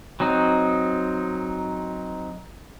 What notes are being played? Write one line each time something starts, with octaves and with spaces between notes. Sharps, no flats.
F#3 C4 D#4